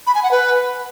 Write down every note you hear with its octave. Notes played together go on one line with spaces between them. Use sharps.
B5
G#5
F#5
B4